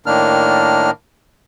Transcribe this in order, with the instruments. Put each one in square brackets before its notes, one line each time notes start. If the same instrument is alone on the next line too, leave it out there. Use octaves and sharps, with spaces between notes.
[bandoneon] A2 D#3 A#3 D4 F6